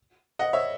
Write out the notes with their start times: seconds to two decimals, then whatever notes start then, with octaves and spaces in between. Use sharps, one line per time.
0.39 D#5 F#5
0.53 C#5 E5